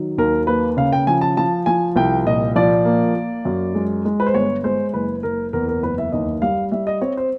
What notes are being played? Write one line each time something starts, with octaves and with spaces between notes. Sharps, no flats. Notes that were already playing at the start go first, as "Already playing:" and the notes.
Already playing: D#3 F#3
D#2 A#4
A#3 B4
C#3 F5
G5
F3 G#5
A5
F3 A5
F3 G#5
C2 G5
A#2 D#5
F3 D5
A#3
A#3
F#2
G#3
G#3
B4
C5
G1 C#5
G#3 C5
F#1 B4
F#1 A#4
E2 A#4
A#4
F#1 B4
E5
D#2 D#5
G3 F5
G3 E5
D#5
C4 C#5
C5